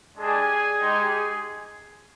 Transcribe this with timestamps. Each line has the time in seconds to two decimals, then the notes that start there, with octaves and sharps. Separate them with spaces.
0.17 G#3 D4 G4 G#4 G#5
0.78 G#3 D#4 G4